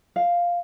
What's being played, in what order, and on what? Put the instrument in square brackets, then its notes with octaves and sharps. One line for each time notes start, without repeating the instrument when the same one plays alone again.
[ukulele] F5